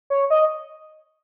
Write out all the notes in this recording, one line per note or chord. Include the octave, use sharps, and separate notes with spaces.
C#5
D#5